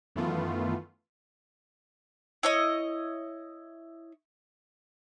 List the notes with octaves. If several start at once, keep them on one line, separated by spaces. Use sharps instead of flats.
F#2 D#3 E3 A3 B3 F4
E4 C#5 D#5